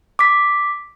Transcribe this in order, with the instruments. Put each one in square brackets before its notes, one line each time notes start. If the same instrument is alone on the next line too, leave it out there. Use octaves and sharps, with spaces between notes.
[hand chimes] D6 B6